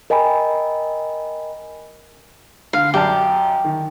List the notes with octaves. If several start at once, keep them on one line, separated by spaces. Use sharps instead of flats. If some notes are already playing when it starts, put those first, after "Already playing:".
A#4 D#5 G5 G#5 B5
D3 F5
F#2 G4 D5 A5
D#3